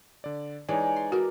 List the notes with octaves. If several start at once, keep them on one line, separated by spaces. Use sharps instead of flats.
D3 D5
E3 G#3 D#4 G#4 C#5 D5
C6
F#4 A#4 D5